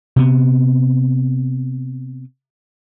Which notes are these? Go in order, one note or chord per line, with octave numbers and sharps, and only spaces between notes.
C3 B3